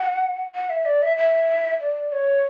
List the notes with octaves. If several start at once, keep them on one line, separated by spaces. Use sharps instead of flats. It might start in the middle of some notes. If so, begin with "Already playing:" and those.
Already playing: F#5
F#5
E5
D5
E5
E5
D5
C#5